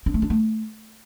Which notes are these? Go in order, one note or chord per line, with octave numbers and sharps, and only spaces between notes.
D4
A3
D4
A3